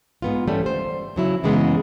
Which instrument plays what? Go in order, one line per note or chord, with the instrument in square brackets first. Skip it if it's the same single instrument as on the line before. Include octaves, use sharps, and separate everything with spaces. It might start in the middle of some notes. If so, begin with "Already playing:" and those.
[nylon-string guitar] G#2 B3 F4
E3 G3 A3 C#4
C5
C#3 F#3 E4
F#2 C#3 E3 G#3 A#3 B3